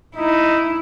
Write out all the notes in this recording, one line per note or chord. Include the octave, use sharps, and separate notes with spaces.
D#4 E4